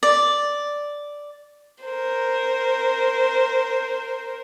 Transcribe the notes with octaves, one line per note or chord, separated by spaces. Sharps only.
D5
A#4 C5